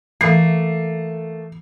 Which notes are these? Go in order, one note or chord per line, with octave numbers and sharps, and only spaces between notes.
E3 A3 A#3 C7